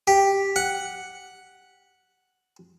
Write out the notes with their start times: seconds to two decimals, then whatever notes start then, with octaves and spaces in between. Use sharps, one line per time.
0.07 G4
0.56 F#5